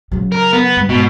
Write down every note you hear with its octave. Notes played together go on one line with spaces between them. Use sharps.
C#3 F#3
A#4
B3
G2
G#2 B2